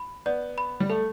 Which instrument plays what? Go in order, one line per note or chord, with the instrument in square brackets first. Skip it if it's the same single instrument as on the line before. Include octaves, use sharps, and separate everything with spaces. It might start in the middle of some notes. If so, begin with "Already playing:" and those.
Already playing: [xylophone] B5
[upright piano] B3 [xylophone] D5
[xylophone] B5
[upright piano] G3
[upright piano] A3 [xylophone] A4